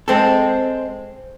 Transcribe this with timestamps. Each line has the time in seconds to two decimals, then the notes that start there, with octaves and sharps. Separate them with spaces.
0.08 G#3 C4 A4